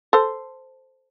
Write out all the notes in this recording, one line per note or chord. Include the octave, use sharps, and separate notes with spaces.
A4 C5